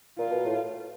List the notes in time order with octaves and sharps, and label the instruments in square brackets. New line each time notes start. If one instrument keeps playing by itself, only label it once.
[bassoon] A#2 [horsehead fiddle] F4
[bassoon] B2
A2